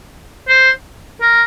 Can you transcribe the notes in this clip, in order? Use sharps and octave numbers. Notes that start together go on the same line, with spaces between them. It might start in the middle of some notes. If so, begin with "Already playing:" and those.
C5
A#4